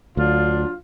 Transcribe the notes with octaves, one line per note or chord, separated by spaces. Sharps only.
D2 F#3 D4 F4